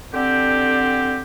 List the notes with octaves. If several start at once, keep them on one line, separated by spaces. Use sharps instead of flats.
D3 C4 G4